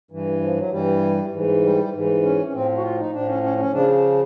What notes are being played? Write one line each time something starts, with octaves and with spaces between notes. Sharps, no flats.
G2 E3
F3
F#3
G2 E3 G3
G#2 E3
G3
G#2 E3
C#4
C#4
A2 F3 C4
F#4
F4
D#4
A2 F3 D4
C#4
C#4
C#4
C#3 F3 D4